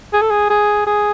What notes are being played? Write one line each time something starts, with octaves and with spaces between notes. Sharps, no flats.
G#4
A4
G#4
G#4
G#4